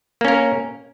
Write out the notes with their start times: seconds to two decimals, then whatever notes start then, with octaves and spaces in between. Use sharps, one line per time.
0.21 A#3
0.25 C#4
0.28 A#4